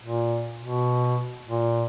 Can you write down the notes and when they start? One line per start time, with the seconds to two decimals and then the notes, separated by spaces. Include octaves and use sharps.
0.03 A#2
0.61 B2
1.47 A#2